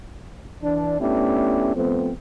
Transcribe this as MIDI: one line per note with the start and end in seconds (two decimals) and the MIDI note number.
0.63 0.98 52
0.63 0.98 62
1.00 1.73 57
1.00 1.73 59
1.00 1.73 61
1.00 1.73 62
1.00 1.73 64
1.00 1.73 67
1.76 2.11 53
1.76 2.11 57
1.76 2.11 59
1.76 2.11 60